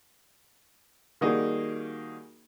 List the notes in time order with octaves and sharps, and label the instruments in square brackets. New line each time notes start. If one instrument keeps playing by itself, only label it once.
[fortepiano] D#3 G3 A#3 D#4 F#4 G#4